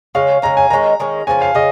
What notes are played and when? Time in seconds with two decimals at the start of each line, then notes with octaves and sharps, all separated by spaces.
0.15 C#3 G#3 C#4 F5
0.42 C#3 G#3 C#4 A#5
0.57 G#5
0.70 D#3 G#3 C#4 A#5
1.00 D#3 G#3 C#4
1.27 C#3 F3 A#3 G#5
1.42 F5
1.55 C#3 D#5